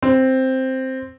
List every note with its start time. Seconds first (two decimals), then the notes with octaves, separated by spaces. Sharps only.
0.03 C4